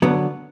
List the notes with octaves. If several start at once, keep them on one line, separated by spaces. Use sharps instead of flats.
D3 F#3 B3